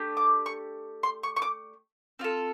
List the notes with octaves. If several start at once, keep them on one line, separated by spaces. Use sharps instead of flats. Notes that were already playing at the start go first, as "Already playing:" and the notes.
Already playing: A3 D4 G4
D6
C#6
C6
C#6
C#6
D6
C4 F4 A4